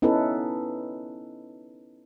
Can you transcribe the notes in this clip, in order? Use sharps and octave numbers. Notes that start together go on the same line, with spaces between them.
B3 C#4 D#4 E4 A4 B4